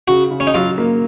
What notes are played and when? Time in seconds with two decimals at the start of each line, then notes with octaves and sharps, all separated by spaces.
0.08 C#3 F#4
0.31 C#3
0.40 C#4
0.47 D#4
0.54 F#3 F4
0.78 A#3